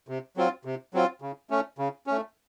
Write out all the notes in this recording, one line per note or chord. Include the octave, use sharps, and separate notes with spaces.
C3
F#3 C4 F4
C3
F#3 C4 F4
C#3
A3 C#4
C#3
A3 C#4